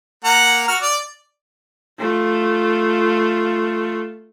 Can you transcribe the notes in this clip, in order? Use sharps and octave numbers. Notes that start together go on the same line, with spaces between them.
A#3 F#5 A#5
F#4 F6
D5
A3 F4